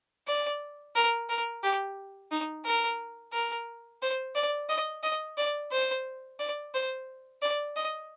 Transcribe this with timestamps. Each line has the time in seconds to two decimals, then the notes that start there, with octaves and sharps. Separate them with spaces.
0.28 D5
0.95 A#4
1.29 A#4
1.63 G4
2.31 D#4
2.65 A#4
3.33 A#4
4.02 C5
4.35 D5
4.69 D#5
5.03 D#5
5.37 D5
5.72 C5
6.39 D5
6.74 C5
7.42 D5
7.76 D#5